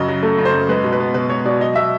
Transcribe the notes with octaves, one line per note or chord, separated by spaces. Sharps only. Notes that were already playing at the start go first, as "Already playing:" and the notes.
Already playing: F#2 C#3 D#5
F#3
A3
C#3
C5
F#2
G#3 B4
B2
B4
B3
B2 B4
G#3 C#5
B2 D5
F#3 D#5
B2 E5